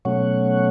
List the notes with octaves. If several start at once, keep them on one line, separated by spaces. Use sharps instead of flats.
B2 F#3 A3 C#4 C#5 F#5